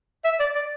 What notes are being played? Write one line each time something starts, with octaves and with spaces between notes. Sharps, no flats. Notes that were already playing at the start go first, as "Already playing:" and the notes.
E5
D5
D5